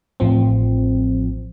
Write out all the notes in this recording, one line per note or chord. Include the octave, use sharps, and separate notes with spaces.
A1 F3 C4